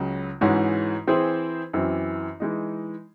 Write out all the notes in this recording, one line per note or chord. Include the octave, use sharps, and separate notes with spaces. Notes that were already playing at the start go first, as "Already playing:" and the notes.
Already playing: C#2 C#3 F#3
G#2 E3 G#3 C#4 F#4
E3 C4 E4 G#4 C5
F#2 E3 C4
E3 G#3 D#4